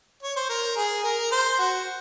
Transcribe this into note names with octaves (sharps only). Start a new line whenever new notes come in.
C#5
C5
A#4
G#4
A#4
C5
F#4